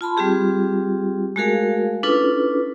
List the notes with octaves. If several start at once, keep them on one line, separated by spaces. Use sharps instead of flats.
F4 A5 B5 C6
G3 C4 F4 G4 G#4
G#3 A3 F#4 G#4 A#4 F5
C#4 D4 E4 F4 A4 B4